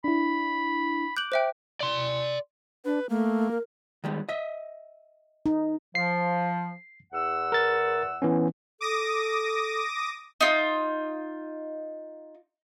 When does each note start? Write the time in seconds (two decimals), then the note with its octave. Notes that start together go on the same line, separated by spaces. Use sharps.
0.04 D4 E4 B5
1.17 D6 F#6 G6 F#7
1.32 C5 E5 G5
1.80 D5 C6
2.84 D4 B4
3.09 A3 A#3
3.51 A#4
4.04 D#3 G3 G#3
4.29 D#5 E5
5.46 D#4
5.95 F3 C7
7.13 E2 F#5 E6
7.52 A#4 A6
8.22 E3 B3 C#4
8.81 A4 D6 D#6 A#6
10.41 D#4 F4